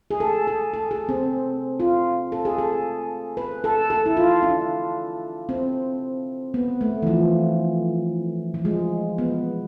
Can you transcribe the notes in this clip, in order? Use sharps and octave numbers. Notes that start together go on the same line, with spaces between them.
G#4
A4
A4
A4
G#4
C4
F4
A4
G#4
A4
B4
A4
A4
E4
F4
D4
C4
B3
A3
E3
F3
F3
G#3
B3